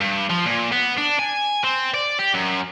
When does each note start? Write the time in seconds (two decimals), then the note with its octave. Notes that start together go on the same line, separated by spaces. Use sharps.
0.01 G2
0.30 F3
0.46 A#2
0.72 B3
0.98 D4
1.19 G#5
1.64 C4
1.94 D5
2.19 G4
2.34 F#2